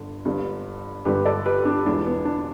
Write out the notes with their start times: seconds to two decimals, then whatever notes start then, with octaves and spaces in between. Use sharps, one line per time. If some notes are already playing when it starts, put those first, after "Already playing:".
Already playing: G1 G2 D3
0.25 G1 G2 D3 G3
1.05 G1 G2 D3 G3 G4 B4
1.25 A4 D5
1.45 G4 B4
1.65 D4 G4
1.85 E1 E2 E3 G3 D4
2.06 B3
2.25 D4